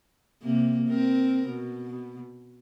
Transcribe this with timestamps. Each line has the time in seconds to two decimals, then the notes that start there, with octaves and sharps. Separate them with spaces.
0.42 C3 A#3
0.88 C4 A#4
1.49 B2